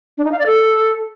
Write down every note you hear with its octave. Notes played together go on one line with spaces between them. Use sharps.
D4
D#4
F5
D5
A4